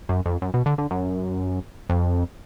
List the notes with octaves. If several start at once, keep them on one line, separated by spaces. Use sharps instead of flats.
F#2
F2
F#2
B2
D3
D3
F#2
F2